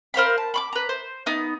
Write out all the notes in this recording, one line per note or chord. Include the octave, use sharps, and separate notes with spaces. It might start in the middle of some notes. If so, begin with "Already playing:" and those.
A#4 C5 F5 B5
A5
B5 C6 D6
B4 A#5
C5
B3 D#4 D#6